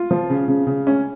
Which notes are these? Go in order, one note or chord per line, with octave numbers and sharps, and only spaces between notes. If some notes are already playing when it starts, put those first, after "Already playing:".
Already playing: F4
F3
C#3
C#3
C#3
C#4